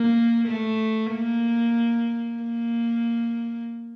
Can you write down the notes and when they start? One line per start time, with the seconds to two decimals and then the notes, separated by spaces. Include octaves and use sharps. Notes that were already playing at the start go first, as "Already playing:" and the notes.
Already playing: A#3
0.47 A3
1.12 A#3
2.43 A#3